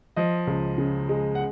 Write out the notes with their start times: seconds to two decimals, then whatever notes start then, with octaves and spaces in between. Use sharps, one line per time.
0.16 F3 D#5
0.47 C#2
0.78 C#3
1.09 G#3
1.35 F#5